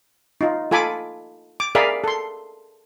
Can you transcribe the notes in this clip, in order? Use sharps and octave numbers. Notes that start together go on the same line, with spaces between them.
D#4 F4
F4 A4 G#5 B5 D6
D6
G#4 A#4 D5 E5 F5 B5
A4 C6